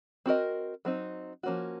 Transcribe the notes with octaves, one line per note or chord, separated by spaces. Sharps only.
C4 F#4 A#4 D#5
F#3 C4 D#4
F3 A#3 C#4 F#4